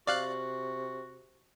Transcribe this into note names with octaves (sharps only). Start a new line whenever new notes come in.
C3 F#4 D5 F5 F#6